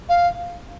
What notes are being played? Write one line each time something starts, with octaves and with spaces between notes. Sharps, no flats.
F5